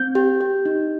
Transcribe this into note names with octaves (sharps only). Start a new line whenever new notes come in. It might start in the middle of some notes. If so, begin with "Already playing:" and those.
Already playing: C4 G6
G4
G4
D#4